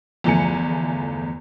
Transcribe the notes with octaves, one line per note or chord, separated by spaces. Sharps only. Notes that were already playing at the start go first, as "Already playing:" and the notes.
G1 E2 F3 A3 G#5 C#7